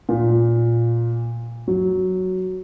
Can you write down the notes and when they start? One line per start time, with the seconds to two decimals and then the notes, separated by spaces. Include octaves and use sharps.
0.09 A#2
1.68 F#3